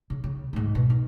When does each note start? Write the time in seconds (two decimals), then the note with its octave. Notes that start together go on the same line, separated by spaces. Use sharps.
0.10 C#3
0.24 C#3
0.53 D2 G#2
0.75 B2
0.90 D#4